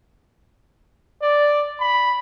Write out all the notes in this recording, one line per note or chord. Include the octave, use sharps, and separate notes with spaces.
D5
B5